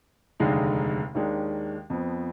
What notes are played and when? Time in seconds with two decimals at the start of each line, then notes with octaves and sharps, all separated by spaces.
0.40 F1 D#2 D3 G#3 D#4
1.15 D#2 D#3 G#3 D4
1.90 F2 F3 B3